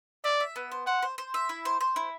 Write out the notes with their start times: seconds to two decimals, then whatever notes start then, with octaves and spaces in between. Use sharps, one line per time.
0.24 D5 E5
0.40 E5
0.56 B3
0.72 C5
0.87 C5 F#5
1.02 C5
1.18 C5
1.34 E5
1.49 E4
1.65 C5
1.81 C5
1.96 E4